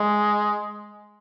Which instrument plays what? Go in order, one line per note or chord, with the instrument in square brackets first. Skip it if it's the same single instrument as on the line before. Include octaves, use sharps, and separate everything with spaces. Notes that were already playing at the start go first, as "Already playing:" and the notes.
Already playing: [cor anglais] G#3